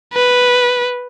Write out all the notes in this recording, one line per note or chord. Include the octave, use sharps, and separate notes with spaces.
B4